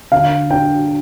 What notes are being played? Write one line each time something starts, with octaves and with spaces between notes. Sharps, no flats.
D3 F5
D4 G5